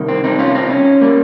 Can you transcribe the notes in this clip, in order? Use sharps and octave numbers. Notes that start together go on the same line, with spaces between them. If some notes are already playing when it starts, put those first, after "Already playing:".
Already playing: C2 C3 D#3
C4
C4 D#4
C#4 F4
C4 D#4
C#4
G3 A#3